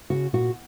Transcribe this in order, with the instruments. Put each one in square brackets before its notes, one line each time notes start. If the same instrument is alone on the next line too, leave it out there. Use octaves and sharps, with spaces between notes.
[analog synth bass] C#3 [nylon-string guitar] F#4
[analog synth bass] A#2 [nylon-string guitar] F#4